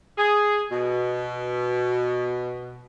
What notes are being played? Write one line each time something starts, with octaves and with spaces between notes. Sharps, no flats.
G#4
B2